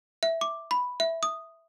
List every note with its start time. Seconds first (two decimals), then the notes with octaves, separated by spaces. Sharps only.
0.23 E5
0.41 D6
0.71 B5
1.00 E5
1.23 D#6